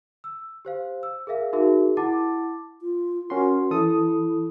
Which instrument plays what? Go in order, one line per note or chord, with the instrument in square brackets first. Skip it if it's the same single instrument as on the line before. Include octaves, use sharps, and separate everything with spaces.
[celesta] E6
G4 C5 F5
E6
G#4 A#4 E5 F5
D#4 F#4 G#4 A#4 E5
E4 F#5 A5 D6 A6
[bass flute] F4
[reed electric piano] C#4 F#4 C6 [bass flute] A#4
[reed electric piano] E3 A4 D#6 [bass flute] E4